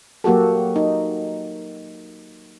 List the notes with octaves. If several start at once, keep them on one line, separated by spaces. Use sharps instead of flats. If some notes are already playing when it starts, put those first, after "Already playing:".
F#3 A#3 F#4 G4 A4
D#4